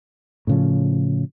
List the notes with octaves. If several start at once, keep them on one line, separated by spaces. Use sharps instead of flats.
A2 C#3 F3